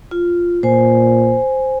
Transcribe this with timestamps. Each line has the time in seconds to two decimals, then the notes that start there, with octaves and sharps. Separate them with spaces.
0.11 F4
0.63 A#2 C5 G#5